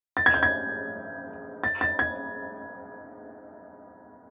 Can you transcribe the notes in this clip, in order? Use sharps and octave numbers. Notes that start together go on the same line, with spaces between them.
A6
G#6
G6
G#6
A6
A6
G#6